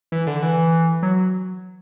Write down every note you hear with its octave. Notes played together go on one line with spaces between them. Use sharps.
E3
D3
E3
F#3